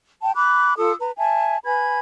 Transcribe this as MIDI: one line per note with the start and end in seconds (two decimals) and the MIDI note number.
0.22 0.32 79
0.22 0.32 81
0.35 0.74 83
0.35 0.74 86
0.35 0.74 90
0.77 0.93 65
0.77 0.93 69
0.77 0.93 87
0.77 0.93 88
1.00 1.11 71
1.00 1.11 82
1.18 1.57 76
1.18 1.57 80
1.18 1.57 81
1.64 1.99 71
1.64 1.99 80
1.64 1.99 83
1.64 1.99 92